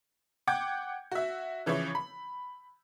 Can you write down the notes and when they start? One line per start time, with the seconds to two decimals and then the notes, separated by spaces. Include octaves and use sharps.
0.47 F#5 G5 D6 G6 G#6
1.11 F#4 E5
1.66 C#3 E3 F3 E4 C#5
1.95 B5